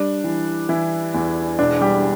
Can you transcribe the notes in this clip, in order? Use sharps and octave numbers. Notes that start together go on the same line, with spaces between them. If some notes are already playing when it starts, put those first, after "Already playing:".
Already playing: G3 D4
E3
E3 E4
E2
E1 D4
G3 G4